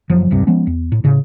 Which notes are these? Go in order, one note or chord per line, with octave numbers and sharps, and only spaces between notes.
F#1 F3 F#3
D#1 C2 G2 C3
F3 G#3 B3 C#4
E2
A2
A2 C#3